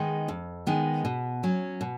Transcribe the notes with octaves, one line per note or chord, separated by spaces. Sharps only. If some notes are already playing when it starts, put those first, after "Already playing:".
Already playing: D#3 G#3 B3 D#4
F2
D#3 G#3 B3 D#4
B2
F#3 C#4
B2